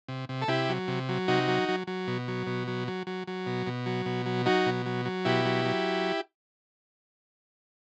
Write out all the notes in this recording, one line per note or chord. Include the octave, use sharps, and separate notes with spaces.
C3
C3
A4
C3 E4 G4
F#3
C3
F#3
C3 D#4 F#4
F#3
F#3
F#3
B2
F#3
B2
F#3
F#3
F#3
F#3
B2
B2
F#3
B2
F#3
F#3 D#4 F#4
B2
F#3
F#3
B2 E4 G4
F#3
F#3